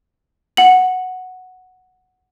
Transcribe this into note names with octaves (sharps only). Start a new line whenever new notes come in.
F#5 F#7